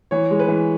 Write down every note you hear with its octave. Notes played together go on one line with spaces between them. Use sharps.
E3 C#5
G#3
B4
E3